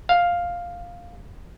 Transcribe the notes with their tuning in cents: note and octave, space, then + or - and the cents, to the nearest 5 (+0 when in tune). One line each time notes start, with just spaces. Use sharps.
F5 +5